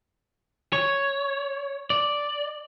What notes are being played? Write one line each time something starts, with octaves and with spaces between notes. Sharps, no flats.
C#5
D5